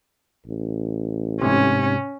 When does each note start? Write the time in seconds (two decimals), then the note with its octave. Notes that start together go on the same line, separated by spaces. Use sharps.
0.46 A1
1.41 G#2 C3 C#4